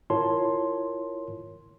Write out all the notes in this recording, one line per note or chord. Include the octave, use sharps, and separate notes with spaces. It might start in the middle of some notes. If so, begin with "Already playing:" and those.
E4 F4 A#4 C#5 A5 C6